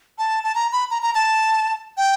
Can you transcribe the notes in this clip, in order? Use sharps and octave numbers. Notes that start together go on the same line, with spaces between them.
A5
A5
A#5
B5
A#5
A#5
A5
G5